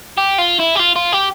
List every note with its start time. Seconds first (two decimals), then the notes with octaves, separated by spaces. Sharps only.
0.17 G4
0.38 F4
0.60 E4
0.76 G4
0.80 F4
0.96 F4
1.13 G4